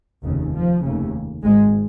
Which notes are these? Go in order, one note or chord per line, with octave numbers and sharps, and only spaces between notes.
F1 D#2 C#3
F3
F1 D#2 C#3
G#1 G#2 G#3